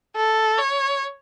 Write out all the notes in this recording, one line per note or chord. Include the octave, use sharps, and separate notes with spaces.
A4
C#5